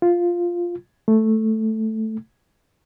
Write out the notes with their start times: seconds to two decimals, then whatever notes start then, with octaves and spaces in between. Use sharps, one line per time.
0.02 F4
1.08 A3